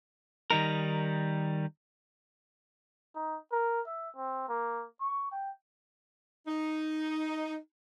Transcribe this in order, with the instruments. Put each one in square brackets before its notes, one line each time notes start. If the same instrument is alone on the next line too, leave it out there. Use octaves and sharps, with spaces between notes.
[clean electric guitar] D#3 G3 D#4 A#4
[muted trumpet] D#4
A#4
E5
C4
A#3
C#6
G5
[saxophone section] D#4